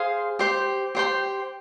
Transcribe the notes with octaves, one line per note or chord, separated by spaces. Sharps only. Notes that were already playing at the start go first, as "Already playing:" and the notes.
Already playing: G#4 C5 F5 C6
G4 C5 G5 C6
G4 C5 G5 C6